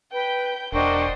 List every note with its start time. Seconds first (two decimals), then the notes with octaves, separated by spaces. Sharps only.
0.13 B4 G5 G6
0.73 E1 D4 A#4 C5 D#5 F#5 G5 C#6